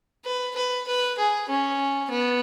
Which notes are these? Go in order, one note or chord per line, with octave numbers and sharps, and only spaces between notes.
B4
B4
B4
G#4
C#4
B3